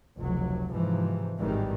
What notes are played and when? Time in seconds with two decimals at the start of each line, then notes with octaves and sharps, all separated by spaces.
0.17 F1 C#2 F#3
0.71 G#2 C3 E3 F3
1.38 G#1 A2 D#3 E3 G3 G#3